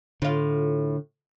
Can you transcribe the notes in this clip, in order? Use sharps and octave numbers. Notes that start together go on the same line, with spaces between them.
A2 D3 F4